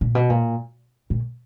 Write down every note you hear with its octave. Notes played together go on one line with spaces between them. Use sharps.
A#2
B2
A#2
A#2